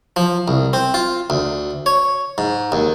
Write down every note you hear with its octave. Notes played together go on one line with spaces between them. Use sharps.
F3
C2
C4
F4
D2
C#5
G#2
D#2